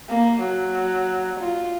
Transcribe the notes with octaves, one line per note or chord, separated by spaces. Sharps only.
A#3
F#3
F4